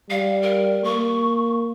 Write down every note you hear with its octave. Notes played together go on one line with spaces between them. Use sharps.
G3 F5
A#4
A#3 C#6